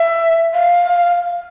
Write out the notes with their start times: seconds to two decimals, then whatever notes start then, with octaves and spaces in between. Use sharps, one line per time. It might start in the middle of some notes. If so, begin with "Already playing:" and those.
Already playing: E5
0.53 F5